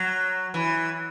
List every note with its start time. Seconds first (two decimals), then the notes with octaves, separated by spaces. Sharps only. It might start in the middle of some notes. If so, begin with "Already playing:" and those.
Already playing: F#3
0.54 E3